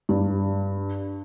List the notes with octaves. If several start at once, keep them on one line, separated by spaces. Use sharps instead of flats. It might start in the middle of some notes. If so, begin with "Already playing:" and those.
G2